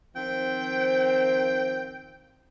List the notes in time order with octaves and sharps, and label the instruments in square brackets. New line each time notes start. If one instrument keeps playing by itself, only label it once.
[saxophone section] D#3 F3 C4 [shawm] G5